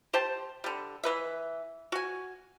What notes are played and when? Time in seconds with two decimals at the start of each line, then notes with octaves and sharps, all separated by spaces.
0.13 G4 C5 G5 A5
0.64 D3 G3
1.03 E3 B4 E5
1.92 F#4 G#5